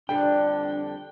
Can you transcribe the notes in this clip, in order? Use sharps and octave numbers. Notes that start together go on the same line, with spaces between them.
F2 D3 G3 D4 G5